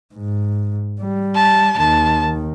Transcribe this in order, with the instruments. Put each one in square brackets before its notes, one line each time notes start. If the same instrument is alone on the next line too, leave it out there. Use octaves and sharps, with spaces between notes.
[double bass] G#2
G3
[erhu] A5
[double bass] D#2 D#3 [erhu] A5